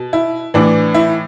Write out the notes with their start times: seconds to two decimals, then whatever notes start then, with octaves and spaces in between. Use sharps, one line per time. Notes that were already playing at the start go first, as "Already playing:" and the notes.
Already playing: B2
0.13 E4
0.54 A2 E3 D4
0.94 E4